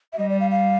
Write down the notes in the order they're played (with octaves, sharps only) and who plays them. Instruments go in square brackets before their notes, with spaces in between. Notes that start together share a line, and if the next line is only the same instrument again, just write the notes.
[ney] E5
[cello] G3 [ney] D#5
[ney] D5
F5
F5